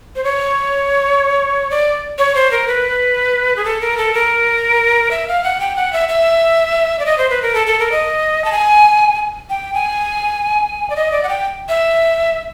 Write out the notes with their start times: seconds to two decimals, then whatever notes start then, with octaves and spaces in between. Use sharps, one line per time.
0.16 C5
0.24 C#5
1.71 D5
2.18 C#5
2.35 C5
2.51 A#4
2.68 B4
3.56 G#4
3.65 A4
3.81 A#4
3.98 A4
4.14 A#4
5.11 E5
5.28 F5
5.44 F#5
5.60 G5
5.76 F#5
5.93 E5
6.09 E5
6.99 D5
7.06 D#5
7.18 C5
7.30 B4
7.42 A#4
7.55 A4
7.67 A4
7.79 A#4
7.92 D#5
8.45 A5
8.52 G#5
9.50 G5
9.74 G#5
10.90 D5
10.96 D#5
11.12 D5
11.23 F#5
11.29 G5
11.69 E5